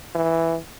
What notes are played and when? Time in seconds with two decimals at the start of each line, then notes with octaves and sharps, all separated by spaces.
0.15 E3